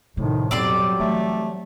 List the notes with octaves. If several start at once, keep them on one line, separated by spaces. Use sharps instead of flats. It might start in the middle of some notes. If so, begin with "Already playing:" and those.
A2 C3 D#3 F3
F2 B2 F#3 G3 C4 D5 C6
E3 A3 D#4